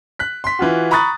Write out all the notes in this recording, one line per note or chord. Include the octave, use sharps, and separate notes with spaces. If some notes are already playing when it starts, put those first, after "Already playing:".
F#6 B6
C6 B6
E3 F4 F#4
A#5 B5 C#6 D#6 F#6 A6